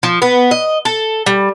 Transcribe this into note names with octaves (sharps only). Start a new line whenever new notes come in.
F3
B3
D#5
A4
G3